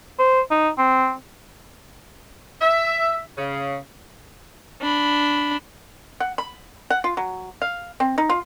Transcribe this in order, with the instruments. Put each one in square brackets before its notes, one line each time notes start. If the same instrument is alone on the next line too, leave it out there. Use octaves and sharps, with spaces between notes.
[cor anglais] C5
D#4
C4
[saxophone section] E5
C#3
[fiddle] D4 B5
[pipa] F#5
B5
F#5
F4
F#3
F5
C4
D#4
F4